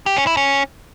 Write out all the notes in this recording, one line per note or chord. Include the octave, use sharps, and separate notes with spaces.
G4
C#4
E4
C#4